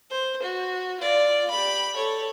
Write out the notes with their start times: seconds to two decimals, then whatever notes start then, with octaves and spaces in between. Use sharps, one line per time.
0.10 C5
0.42 F#4
1.00 F4 D5
1.50 G4 B5
1.95 A4 C#5